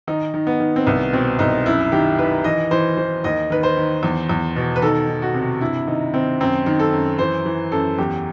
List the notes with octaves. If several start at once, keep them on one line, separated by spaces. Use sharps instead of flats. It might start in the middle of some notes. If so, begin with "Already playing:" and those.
D#3 D#4
D#3
B3
D#3
C4
C2 B3
B2 C4
C2 D#4
F#2 E4
D#3 G4
D#3 B4
E3 D#5
E3 C5
E3 C5
D#2 D#5
D#3 B4
C5
D#3
E2
E2
B2
B4
D#3 A4
D#3
F#4
C3
G2 E4
D#3 D#4
D#3 C4
F#2 C4
D#3
A4
F#2
E3 C5
E3
F#2 A4
E2 G4